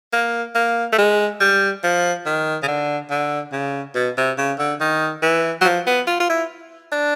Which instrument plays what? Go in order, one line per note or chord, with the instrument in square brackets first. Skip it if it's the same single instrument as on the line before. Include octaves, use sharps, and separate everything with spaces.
[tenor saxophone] A#3
A#3
A3
G#3
G3
F3
D#3
C#3
D3
D3
C#3
B2
C3
C#3
D3
D#3
E3
F#3
F3
B3
F4
F4
E4
D4